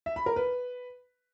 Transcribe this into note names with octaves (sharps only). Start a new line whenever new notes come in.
E5
B5
A#4
B4